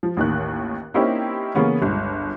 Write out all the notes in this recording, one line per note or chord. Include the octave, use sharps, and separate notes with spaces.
F3
A1 D#2 D#3 F#6
A#3 C4 C#4 D#4 E4 G4
C#3 E3 A#3 B3 C#4
G1 C#2